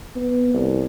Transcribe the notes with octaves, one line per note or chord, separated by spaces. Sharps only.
B3
C2